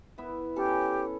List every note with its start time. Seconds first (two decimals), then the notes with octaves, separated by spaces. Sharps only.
0.18 B3 E4 E5
0.56 B3 C#4 G4 A4